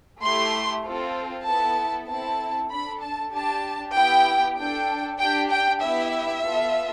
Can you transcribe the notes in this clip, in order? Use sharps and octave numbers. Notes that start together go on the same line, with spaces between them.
A3 E4 G4 C6
C4 F4 A4
B3 E4 A4 A5
C4 E4 A4 A5
D4 A4 B5
A5
D4 G4 A5
B3 E4 G4 G5
D4 A4 G5
D4 G4 G5
G5
B3 E4 G4 E5
B3 F4 A4